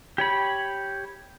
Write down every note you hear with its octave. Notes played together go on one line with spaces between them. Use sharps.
G4 C#5 B5